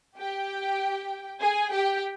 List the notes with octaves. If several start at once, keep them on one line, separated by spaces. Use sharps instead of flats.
G4 G5
G#4 G#5
G4 G5